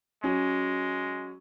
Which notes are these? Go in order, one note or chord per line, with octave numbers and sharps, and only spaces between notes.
F#3 G#3 C#4